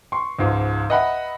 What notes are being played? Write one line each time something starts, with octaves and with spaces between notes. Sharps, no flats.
C6 C#6
C#2 G#2 F3
B4 D#5 E5 F#5 A#5 B5